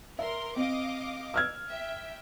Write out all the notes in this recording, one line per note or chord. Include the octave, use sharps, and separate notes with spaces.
A#4 E5 C6
C4 D#5 F5 D6
E6 F6 G#6
E5 G5